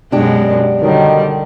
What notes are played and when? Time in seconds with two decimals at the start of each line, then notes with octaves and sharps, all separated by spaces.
0.12 F#2 B2 G#3 D4 G4
0.81 D3 D#3 F#3 G3